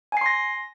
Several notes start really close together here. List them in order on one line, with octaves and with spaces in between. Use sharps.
G#5 C7 C6 A#6